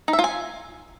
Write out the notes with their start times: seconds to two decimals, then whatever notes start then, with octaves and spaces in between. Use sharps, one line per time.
0.08 D#4
0.13 E5
0.19 F4
0.24 G#5